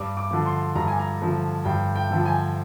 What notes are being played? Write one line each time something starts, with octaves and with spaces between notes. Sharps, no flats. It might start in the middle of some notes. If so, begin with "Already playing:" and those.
Already playing: G2 D6
D6
D3 F3
C6
G2 A#5
G#5
A#5
D3 F3
G2 G5
G5
D3 F3
G#5